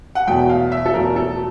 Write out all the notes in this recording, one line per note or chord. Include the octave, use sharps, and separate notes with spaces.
F#5
E2 B2 F#3 A3 G5
F5
E5
A4
E2 B2 F#3 A3 A#4
A4